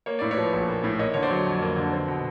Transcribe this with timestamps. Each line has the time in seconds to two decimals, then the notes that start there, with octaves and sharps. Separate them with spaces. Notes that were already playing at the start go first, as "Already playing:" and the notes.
0.06 A#3 C#5
0.19 A2 D5
0.31 B4 C#5
0.37 F3
0.53 A#1
0.68 A#3
0.84 A2
0.99 A#3 C#5 D#5
1.14 D3 C#5
1.23 C5 D5
1.30 F#3
1.46 F2
1.62 A#3
1.77 D3
1.93 C4
2.08 B2